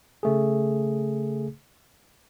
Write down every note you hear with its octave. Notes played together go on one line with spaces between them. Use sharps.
C#3 A3 G#4